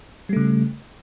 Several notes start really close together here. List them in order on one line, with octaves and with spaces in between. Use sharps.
G3 A3 C#3